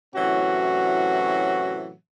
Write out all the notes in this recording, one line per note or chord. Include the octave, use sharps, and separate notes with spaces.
A2 C3 E3 F#3 C#4 F#4